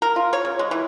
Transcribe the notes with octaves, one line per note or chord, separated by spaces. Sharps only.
A#4
F4
C#5
C#3
G#3
E3